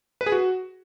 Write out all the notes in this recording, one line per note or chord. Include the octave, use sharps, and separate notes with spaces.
B4
G#4
F#4